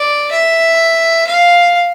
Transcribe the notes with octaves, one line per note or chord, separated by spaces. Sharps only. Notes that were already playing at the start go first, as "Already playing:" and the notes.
Already playing: D5
E5
F5